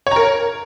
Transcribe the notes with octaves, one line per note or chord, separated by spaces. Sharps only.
A#4 C#5 A#5